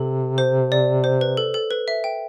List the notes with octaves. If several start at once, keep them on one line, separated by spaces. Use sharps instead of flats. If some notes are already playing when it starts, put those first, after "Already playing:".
Already playing: C3 A4
C5
D5
C5
B4
A4
A4
B4
E5
G5